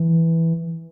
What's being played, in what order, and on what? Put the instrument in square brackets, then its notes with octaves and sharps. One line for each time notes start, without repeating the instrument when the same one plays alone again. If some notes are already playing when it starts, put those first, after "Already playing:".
Already playing: [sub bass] E3